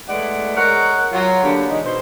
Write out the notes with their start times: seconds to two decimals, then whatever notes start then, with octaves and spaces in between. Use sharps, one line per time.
0.08 G#3 A3 B3 E4 D5 F#5
0.56 G#3 A#4 C#5 F#5
1.12 F#3 F4
1.43 D3 F#3 A#3 B3 D4 G4
1.70 B2 E3 G#3 D#4
1.84 B2 C5